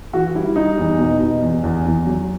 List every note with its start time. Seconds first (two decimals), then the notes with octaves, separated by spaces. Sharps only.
0.13 E3 F#4
0.35 G3 E4
0.56 G3 D#4
0.78 E2
0.99 B2
1.20 B2
1.42 E2
1.64 E2
1.85 E2
2.07 F#3